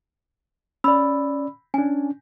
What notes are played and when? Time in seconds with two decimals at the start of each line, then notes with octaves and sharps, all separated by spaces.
0.84 C#4 D5 B5 E6
1.74 C#4 D4 G#5